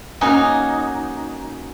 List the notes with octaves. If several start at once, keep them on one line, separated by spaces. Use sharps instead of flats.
A#3 C#4 D#4 F#4